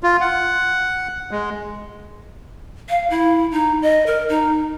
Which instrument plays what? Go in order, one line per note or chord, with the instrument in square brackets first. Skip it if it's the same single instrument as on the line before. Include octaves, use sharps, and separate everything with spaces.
[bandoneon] F4
F#5
G#3
[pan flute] F5
E4
D#4
D#5
A#4
D#4